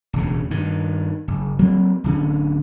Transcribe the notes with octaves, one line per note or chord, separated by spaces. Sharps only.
E1 D2 C#3
G2 D#3
F#1
F#3 A#3 C4
D1 D3 C#4